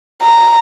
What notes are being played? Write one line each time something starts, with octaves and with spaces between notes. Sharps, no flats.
A#5